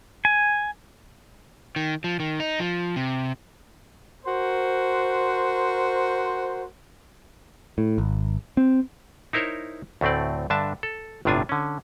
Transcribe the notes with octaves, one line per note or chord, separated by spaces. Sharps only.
G#5
D#3
F3
D#3
D#4
F3
C3
F#4 A#4 C5
A2
G#1
C4
D#4 E4 A#4 C5 C#5
D2 A2 A3 C4 D5
G2 D3 D4 E5 A5
A4
G1 A2 C3 D4 F4 G#5
D3 C#4